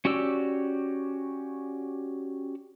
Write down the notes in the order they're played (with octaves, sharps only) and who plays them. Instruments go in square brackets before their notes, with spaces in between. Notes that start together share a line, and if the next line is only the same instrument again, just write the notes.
[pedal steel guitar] C#4 F#4 G4 D5 E6